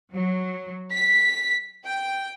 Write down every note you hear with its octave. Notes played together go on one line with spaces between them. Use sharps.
F#3
B6
G5